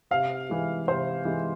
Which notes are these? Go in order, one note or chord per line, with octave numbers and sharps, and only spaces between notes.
C3 F5
E3 G#3
C3 C5
E3 G#3